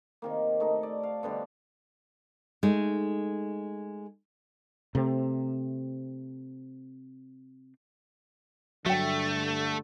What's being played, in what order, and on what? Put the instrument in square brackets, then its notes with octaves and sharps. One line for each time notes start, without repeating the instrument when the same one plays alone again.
[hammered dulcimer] C3 D#3 A#3
A3 D#4
D5
F5
B2 D3 G3
[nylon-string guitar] G#3 A3 D#4
[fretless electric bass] C3 A3 C4
[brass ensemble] G2 D3 [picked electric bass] F#3 [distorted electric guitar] A3 [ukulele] E5 G5